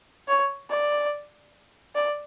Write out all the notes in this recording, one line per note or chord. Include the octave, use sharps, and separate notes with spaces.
C#5
D5
D5